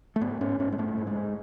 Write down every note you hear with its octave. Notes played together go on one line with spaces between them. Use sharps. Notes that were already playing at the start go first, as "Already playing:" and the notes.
A3
G#2 B3
G#2 C#4
G#2 C#4
G#3
G#2 A3
G#2
G#3
G#2